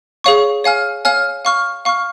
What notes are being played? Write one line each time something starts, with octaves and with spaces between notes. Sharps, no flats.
G#4 C#5 F5 C#6
C#5 F5 G#5 F6
C#5 F5 G#5 F6
F5 C#6 F6
F5 C#6 F6